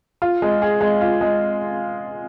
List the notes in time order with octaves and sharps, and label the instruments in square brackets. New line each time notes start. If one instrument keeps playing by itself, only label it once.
[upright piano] F4
G#3
G#4
G#3
F4
G#3